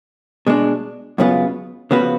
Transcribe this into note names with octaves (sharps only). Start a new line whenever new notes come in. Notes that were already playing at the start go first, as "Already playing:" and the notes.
B2 G#3 D4
F#2 C#3 G#3 B3 F4
C#3 F3 B3 F#4 B4